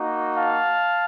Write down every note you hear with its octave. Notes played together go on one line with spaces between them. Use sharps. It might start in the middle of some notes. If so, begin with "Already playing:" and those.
Already playing: A#3 D#4 F#4
F5 A5